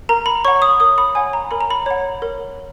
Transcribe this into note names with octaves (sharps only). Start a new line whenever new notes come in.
A#4 A#5
B5
C#5 F#5 C#6
D#6
A#4 D#6
B5
C#5 F#5 G#5
A#5
A#4 B5
A#5
B5
C#5 F#5
A#4